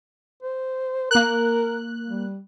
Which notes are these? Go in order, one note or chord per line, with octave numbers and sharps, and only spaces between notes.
C5
A#3 A#4 F#6
G3